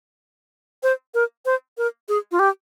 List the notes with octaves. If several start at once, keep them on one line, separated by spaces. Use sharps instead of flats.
C5
A#4
C5
A#4
G#4
F4
G4